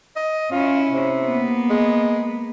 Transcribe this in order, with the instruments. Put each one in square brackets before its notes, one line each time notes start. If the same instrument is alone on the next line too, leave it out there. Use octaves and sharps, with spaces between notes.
[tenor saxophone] D#5
[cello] C#4 E4 [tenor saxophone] F4
[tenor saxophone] C3
[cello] A#3 B3
[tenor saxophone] G#3